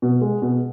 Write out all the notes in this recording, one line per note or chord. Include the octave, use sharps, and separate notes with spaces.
B2
G#3
B2